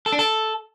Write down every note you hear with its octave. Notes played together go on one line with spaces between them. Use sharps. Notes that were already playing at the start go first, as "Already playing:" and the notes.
A4
D4
A4